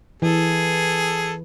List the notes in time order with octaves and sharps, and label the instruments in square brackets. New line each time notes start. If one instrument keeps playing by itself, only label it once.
[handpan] E3 [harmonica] G#4 A4